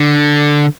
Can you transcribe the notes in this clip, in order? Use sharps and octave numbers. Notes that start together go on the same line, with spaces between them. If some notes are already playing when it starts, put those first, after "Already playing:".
Already playing: D3